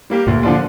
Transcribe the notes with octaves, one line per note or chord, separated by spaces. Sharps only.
G3 A#3 G4
D2 A#2
D3 F3 D4 F4